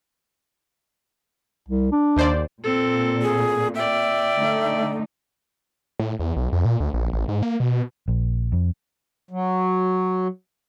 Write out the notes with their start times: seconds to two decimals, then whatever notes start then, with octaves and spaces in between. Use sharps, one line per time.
1.69 C2
1.92 D4
2.16 D#2 C5 D5
2.64 A#2 C4 A4
3.22 G#4
3.75 D5 E5 G5
4.37 D3 A3 D#4
6.00 A2
6.19 E2
6.37 B1
6.53 F2
6.65 A#2
6.80 D2
6.94 A#1
7.13 A1
7.28 G#2
7.42 A#3
7.60 B2
8.08 A#1
8.52 F2
9.31 F#3